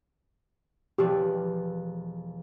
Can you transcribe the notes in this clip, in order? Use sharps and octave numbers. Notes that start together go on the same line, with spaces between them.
E1 F3 G4 B4